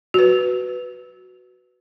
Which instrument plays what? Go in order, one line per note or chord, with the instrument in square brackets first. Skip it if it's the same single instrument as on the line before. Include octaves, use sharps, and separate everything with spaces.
[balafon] F#4 B4